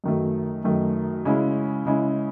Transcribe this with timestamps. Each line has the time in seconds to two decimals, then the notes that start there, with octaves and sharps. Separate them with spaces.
0.04 F#2 D#3 F#3 A3
0.64 F#2 D#3 F#3 A3
1.25 C#3 G#3 C#4 E4
1.86 C#3 G#3 C#4 E4